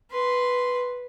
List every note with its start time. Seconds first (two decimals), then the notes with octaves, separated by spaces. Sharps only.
0.10 B4 C6